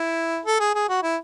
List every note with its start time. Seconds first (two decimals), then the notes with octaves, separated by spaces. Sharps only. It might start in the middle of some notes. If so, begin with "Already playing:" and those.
Already playing: E4
0.45 A4
0.60 G#4
0.75 G#4
0.89 F#4
1.03 E4